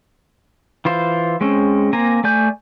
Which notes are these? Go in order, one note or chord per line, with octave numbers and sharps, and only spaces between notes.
E3 F4 C5
G#3 C4 C#4
A#3 C4 G#5 A#5
A3 D5 G#5 G6